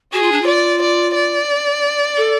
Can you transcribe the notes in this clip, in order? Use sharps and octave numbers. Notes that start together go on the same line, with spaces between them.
F#4 G#4
F4
D4
F4
D5
D5
D5
A4